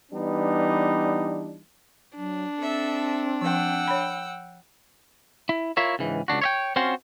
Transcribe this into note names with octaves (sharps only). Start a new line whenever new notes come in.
E3 G3 B3 D4 D#4
F#3 D4
C4 A4 E5
F3 F#5 G5 E6
C#5 B5
E4
E4 F4 A#4 C#5 E5
C#2 G#2 E3
C#2 G2 D4 F#4
C#5 E5 G5
C4 C#4 F4 F#4 C5